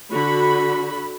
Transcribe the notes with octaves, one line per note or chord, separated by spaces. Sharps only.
D3 F#4 B5